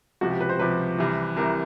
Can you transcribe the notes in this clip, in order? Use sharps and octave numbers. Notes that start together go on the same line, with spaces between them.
C#2 C3 F3 F#4
G4
B4
C5
C#2 C3 F3 B4
C2 C3 E3
C2 C3 E3 A#4